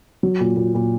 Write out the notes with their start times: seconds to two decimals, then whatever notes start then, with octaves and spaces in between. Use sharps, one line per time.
0.23 F#3
0.40 A#2
0.56 A#2
0.74 A#2